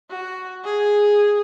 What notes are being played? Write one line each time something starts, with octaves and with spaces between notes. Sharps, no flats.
F#4
G#4